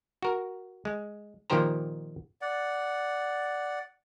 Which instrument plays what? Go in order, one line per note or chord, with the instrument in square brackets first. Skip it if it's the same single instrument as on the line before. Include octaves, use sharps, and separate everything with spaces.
[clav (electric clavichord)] F#4 A#4
G#3
A#2 D#3 F3 G4 C5 A#5
[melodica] D5 F#5